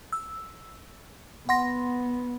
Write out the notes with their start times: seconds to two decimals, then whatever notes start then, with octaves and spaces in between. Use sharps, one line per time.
0.13 E6
1.49 B3 F#5 C6 A#6